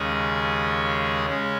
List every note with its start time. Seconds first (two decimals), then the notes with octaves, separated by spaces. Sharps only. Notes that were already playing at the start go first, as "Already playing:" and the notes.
Already playing: D#2 C#3 G#3 C#4 G#4
1.29 C#3 G#3 C#4